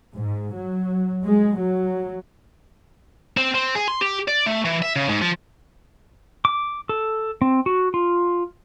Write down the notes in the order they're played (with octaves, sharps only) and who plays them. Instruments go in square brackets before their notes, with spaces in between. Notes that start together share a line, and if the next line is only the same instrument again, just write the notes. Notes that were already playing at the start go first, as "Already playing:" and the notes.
[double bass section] G#2
F#3
G#3
F#3
[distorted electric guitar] C4
C4
G#4
C6
G4
D5
A3
E3
E5
C#3
G#2
F3
[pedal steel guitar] D6
A4
C4
F#4
F4